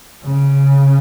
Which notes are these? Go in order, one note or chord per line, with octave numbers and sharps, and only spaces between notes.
C#3